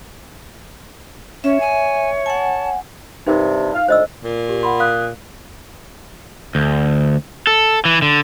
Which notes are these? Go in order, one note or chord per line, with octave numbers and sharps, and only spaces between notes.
C#4 C#5 E5
G#5
F#5 G#5 A5
G2 C3 D#4 A#4
F5
D2 C5 D#5 E6
A#2
G4
F#5 B5 C6
F5 D#6 F#6
D2
A4
E3
D3